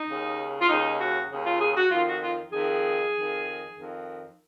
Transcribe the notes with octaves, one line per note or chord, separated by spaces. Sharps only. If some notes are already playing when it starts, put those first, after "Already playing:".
Already playing: D#4
D#2 C#3
F4
D#2 C#3 D#4
F#4
D#2 C#3
F4
G#4
F#4
F2 D#3 F4
F#4
F4
F2 D#3 G#4
F2 D#3
F2 D#3